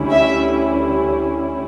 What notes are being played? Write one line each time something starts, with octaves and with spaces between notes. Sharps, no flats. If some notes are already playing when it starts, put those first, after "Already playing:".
Already playing: D2 D3 G3 C#4 E4
E5